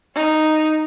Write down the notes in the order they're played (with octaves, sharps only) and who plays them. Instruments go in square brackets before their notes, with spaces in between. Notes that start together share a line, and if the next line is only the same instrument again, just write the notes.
[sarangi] D#4